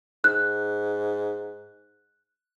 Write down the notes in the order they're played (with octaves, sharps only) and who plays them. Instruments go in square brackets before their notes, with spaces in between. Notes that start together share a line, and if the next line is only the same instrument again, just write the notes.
[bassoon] G#2 [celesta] F#6